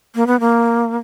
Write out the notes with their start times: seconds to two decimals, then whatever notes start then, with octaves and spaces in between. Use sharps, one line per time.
0.15 A#3
0.27 B3
0.40 A#3